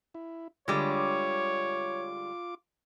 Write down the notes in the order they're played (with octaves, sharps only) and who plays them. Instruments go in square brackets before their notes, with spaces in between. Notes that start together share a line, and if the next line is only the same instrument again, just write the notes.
[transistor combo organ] E4
[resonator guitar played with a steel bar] D3 G3 G#3 [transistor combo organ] F4 D6 [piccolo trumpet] C#5